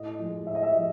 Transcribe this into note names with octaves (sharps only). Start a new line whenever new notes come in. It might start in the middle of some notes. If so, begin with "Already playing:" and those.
Already playing: A2 D#5
F3 G#3
A2 E5
D#5
E5
F3